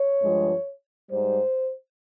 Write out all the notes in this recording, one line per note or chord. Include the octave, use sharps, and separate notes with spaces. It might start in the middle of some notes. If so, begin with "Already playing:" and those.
Already playing: C#5
G2 F3 G#3
G#2 G3 C5